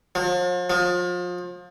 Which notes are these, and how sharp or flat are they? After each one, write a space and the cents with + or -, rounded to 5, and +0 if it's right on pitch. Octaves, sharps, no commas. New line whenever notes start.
F3 +40
F3 +30